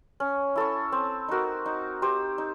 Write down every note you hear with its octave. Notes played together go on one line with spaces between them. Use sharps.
C#4
E4 A4 C#5
C4
D#4 F#4 A#4
D#4
G4 C5
D#4